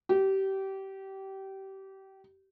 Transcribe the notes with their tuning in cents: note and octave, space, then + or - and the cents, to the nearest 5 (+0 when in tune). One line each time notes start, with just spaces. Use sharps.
G4 -25